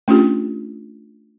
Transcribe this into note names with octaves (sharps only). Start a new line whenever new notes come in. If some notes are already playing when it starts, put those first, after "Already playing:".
A3 C#4 D4 F4 G4